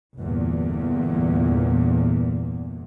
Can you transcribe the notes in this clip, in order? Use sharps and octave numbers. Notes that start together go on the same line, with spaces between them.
G1 E2 A#2